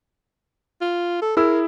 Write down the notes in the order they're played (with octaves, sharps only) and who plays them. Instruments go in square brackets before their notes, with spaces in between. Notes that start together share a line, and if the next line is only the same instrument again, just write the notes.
[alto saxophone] F4
A4
[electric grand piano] E4 G#4 E6 [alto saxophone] A#4